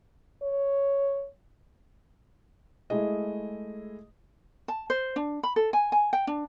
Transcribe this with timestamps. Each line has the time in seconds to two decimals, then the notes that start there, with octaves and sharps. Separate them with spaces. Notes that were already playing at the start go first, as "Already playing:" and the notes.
0.42 C#5
2.90 G#3 A3 E4 G#4 D#5
4.68 A5
4.90 C5
5.16 D4
5.43 B5
5.56 A4
5.73 G#5
5.92 G#5
6.13 G5
6.27 D4